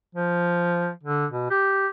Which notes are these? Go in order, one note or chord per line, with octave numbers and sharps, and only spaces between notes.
F3
D3
B2
G4